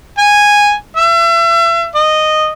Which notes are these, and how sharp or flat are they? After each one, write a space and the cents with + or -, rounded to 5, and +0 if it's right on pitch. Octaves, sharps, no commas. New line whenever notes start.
G#5 -10
E5 +35
D#5 -10